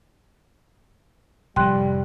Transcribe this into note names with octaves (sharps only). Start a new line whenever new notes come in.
F1 A2 G3 G5 C6 F#6